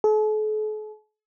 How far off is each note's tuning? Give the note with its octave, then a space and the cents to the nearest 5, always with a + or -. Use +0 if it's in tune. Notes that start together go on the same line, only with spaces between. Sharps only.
A4 -45